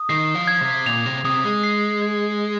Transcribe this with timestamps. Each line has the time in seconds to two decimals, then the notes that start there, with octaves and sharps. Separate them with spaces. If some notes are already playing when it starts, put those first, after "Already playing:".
Already playing: D#6
0.09 D#3 C7
0.35 F3
0.48 G#6
0.61 C3
0.86 A#2 F7
1.06 C3
1.25 C3 D#6
1.44 G#3
1.64 C7
2.02 G#6